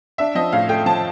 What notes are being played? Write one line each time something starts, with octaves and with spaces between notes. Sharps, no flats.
D4 E5
F3 D#5
A2 F5
A3 G5
F3 A5